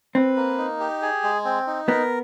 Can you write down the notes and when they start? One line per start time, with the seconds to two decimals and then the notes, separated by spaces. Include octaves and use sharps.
0.15 C4 B4
0.36 A#3
0.58 D#4
0.80 G4
1.02 G#4
1.23 G#3
1.45 C4
1.67 D#4
1.88 B3 A#4